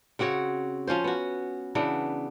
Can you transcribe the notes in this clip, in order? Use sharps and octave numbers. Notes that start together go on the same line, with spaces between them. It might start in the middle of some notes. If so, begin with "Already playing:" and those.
C#3 C4 F#4 C#5
F3 C#4 F4 C5
B3 F#4
C#3 E3 B3 D4